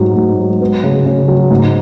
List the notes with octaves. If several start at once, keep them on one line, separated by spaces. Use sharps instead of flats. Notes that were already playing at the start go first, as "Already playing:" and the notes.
Already playing: G#2 F#3
G#2
F#3
B3
C#3
C#3
F#3
G#2